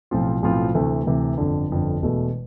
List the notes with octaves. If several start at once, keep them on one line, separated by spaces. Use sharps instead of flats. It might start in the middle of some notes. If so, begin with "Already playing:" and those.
B1 A2 F3 C4 F4
B1 A2 F3 C4 F4
D2 C3 E3 A3
D2 C3 E3 A3
G1 F2 D3
G1 F2 D3
E1 E2 B2 A3